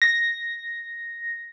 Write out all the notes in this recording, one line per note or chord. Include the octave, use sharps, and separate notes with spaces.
A#6